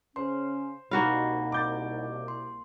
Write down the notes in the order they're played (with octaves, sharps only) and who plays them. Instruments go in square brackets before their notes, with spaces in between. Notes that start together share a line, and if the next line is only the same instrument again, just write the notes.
[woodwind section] C#3 C#4 [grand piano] C5 [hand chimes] C6
[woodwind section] C2 B2 [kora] A#3 F#4 F5 [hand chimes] D#4 F#5 B5
[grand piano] D6 G6 A6
[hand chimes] C6